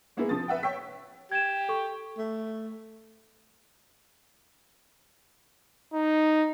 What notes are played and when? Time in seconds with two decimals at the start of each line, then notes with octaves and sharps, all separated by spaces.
0.17 G#3 A#3 B3 E4 G#4
0.29 C3 F3 D#6 A6
0.48 B4 E5 F#5 G5
0.63 C#5 G5 C#6 E6 B6
1.32 G4 G#6 E7
1.69 A4 C#6
2.18 A3
5.94 D#4